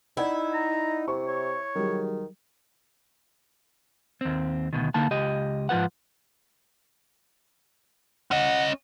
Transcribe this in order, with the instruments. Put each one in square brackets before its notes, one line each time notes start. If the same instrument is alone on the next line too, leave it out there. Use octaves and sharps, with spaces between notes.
[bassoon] D#4 [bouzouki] E4 [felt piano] D5 F#5 G#6
[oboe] A#5
[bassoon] C3 [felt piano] C#6
[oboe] C#5
[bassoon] D#3 [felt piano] F#3 G3 G#4
[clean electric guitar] D#2 C4
D2 G#2 B2 D#3
D3 A#3 D#4 A5
C#2 G4 D#5
G#2 F3 F4 B4 F#5
[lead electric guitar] C#4 D#5 [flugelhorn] F#5